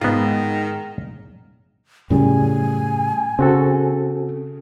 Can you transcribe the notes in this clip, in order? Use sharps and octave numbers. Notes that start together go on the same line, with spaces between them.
G#2 D#3 B3 F4
F#2 A2 C#3 G3 G#5
C#3 C4 F#4 A4